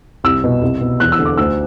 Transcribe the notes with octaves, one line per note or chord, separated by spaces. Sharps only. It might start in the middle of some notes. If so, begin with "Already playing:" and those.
C2 E6
B2
C2
B2
E2 F#6
E6
D3
D6
D2 E6